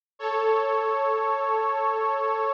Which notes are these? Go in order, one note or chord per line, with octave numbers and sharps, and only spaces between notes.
A4 C#5